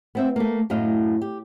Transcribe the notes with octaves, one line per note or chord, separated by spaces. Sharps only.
B3 C4 E5
A3 A#3
F#2 A2 A3 D#5 F5
G4